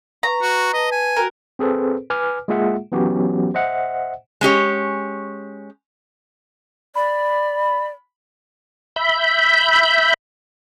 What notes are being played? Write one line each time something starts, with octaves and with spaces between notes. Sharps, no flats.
B4 A#5 C#6
F#4
B4 D#5 A5
G#5
F#4 A#4 G5
C4 G#4 A4 B4 C5
B4 G#5 D6 F6
G#3 A#3 F4 G#4 E5 F#5
E3 F#3 B3 C#4 F#4 G4
C5 D#5 E5 F#5
G#3 C#4 G4 C#5
D5 B5
E5 B5 G6